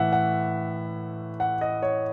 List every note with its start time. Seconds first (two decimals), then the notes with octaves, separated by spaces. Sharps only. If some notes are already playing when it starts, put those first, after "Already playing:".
Already playing: A2 E3 E5 F#5
0.13 F#5
1.40 F#5
1.61 D#5
1.82 C#5